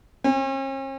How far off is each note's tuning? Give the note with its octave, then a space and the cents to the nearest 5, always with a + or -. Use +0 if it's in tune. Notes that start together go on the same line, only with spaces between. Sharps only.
C#4 -45